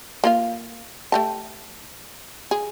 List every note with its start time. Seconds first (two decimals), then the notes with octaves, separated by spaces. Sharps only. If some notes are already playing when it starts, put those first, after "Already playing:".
0.24 A#3 F4 F5
1.12 A3 G4 A5
2.51 G#4